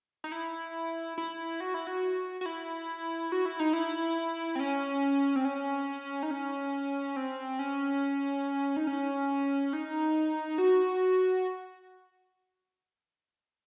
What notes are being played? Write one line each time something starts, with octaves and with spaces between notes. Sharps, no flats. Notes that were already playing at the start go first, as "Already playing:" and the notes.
D#4
E4
E4
F#4
E4
F#4
F#4
E4
F#4
E4
D#4
E4
C4
C#4
C4
C#4
D#4
C#4
C4
C#4
D#4
C#4
D#4
F#4